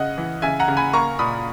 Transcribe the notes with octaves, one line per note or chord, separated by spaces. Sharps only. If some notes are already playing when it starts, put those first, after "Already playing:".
Already playing: C#3 D#5 F#5
E3
C#3 E5 G#5
F#5 A#5
C#3
G#5 B5
A#3 A#5 C#6
A#2 B5 D#6